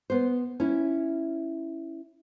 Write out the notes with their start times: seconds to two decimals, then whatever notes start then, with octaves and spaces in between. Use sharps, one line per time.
0.10 B3 C5
0.60 C#4 E4